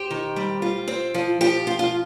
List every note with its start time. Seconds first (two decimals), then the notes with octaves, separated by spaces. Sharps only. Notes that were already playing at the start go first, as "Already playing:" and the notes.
Already playing: G4 C5
0.10 D#3
0.36 G3
0.62 F4
0.88 C4
1.14 F3
1.41 F3 G4
1.67 F4
1.79 F4